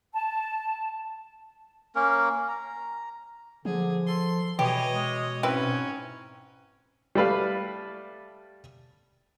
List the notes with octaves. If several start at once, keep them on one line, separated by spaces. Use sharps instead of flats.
A5
A#3 C#4 A#4
A#5
D3 F3 G#4
A4 C6
B2 E3 G4 C#5 D#5
G#3
G#2 C4 C#4 E4 B4
G3 A3 B4 F5